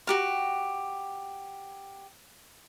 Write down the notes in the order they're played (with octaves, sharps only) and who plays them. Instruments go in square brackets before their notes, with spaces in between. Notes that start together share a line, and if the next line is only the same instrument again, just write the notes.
[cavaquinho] F#4 G4 A#4